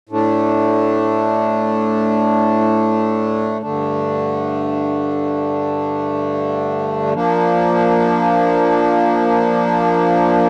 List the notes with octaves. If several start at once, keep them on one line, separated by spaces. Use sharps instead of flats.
A2 A3 D4
G2 D3 A3 D4
F3 A#3 D4